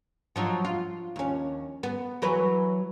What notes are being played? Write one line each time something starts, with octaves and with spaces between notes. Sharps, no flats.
F3 F#3 D#4
F4
D#2 C#4
B3
E3 F#3 B4